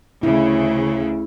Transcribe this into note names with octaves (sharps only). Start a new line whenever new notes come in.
D2 C#3 E4